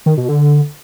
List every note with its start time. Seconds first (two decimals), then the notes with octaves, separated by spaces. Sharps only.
0.06 D#3
0.17 B2
0.29 D3